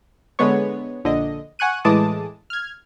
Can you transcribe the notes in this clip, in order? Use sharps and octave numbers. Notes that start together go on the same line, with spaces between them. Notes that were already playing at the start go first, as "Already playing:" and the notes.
D3 G#3 B3 C#5
A#1 D3 D#5
F#5 G#5 C#6 F#6 D#7
A2 E3 G#3 A5 D6 D#6
F6 G#6